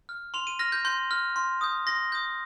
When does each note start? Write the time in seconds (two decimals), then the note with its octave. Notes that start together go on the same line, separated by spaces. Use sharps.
0.09 F6
0.34 C6 F7
0.47 D#7
0.59 F6 A#6
0.72 G6
0.85 C6 G6
1.11 F6
1.36 C6
1.61 D#6 G6
1.87 C6 A#6
2.12 D#6 G6